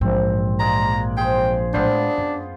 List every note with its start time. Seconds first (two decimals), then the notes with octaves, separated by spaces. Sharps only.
0.01 A#1 G#2 E3 C4
0.60 G#3 A#3 D5 A#5
1.17 G#4 C5 G5
1.74 A2 G#3 B3 D4 F4 C5
2.18 F#2